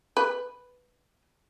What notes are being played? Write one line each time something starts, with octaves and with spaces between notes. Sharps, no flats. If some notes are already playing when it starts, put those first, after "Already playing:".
B4